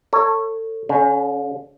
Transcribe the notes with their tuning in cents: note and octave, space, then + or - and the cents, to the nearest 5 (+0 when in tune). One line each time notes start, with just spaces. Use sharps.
A4 +30 C#5 -10
D3 -45 C#4 +0